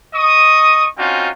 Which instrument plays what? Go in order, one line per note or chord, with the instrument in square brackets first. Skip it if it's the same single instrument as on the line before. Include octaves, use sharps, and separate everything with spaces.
[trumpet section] D#5 C#6 D#6
C4 C#4 D#4 F4 F#4